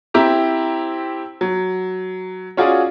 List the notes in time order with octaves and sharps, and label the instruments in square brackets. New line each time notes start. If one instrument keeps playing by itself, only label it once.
[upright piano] C4 E4 G4 A#5
F#3
C#4 F4 F#4 G#4 D5